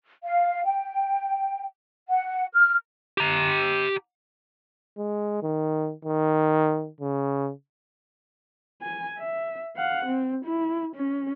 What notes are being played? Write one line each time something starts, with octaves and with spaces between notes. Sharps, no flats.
F5
G5
F#5
F6
G4 A#5
G#3
D#3
D#3
C#3
G#5
E5
F5 F#5
C4
E4
C#4